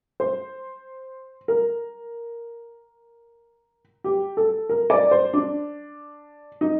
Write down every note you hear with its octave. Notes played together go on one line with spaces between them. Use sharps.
C5
A#4
G4
A4
A#4
D5
C5
D4
D#4